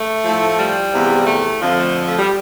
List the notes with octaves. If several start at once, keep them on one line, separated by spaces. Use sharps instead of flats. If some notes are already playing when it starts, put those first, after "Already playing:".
Already playing: A3
A2 F3
G3
E2 C3 F3
A3
F2 D3 F3
A3
A3
G3